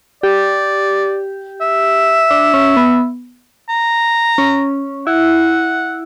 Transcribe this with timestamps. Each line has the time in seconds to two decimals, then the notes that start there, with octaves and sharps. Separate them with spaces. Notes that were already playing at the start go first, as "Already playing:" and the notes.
0.23 G4 D5
1.61 E5
2.31 D4
2.54 C#4
2.77 B3
3.69 A#5
4.38 C#4
5.07 E4 F#5